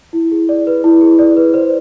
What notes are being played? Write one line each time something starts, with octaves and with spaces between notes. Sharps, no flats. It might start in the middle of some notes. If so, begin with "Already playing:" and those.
E4
G#4
D5
B4
E4
G#4
D5
B4
C5